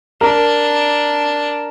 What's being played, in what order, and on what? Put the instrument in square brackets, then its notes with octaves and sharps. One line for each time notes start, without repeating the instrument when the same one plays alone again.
[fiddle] D4 [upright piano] A#4